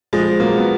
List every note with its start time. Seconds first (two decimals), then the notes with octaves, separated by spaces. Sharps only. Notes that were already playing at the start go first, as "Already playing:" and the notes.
0.13 F3 G#3
0.40 F#3 A#3
0.57 B3